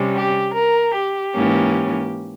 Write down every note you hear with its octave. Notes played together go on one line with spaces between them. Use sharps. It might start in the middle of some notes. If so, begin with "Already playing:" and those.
Already playing: C3 G3 C#4
G4
A#4
G4
G#2 E3 A#3 C#4